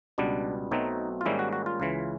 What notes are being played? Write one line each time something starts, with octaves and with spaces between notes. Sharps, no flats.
C#2 B2 G3 B3 D4
B1 B2 F#3 A3 C4 D#4
F4
G#2 D#3 G3 A#3 C#4 E4
F#4
F#4
F4
C#2 C#3 E3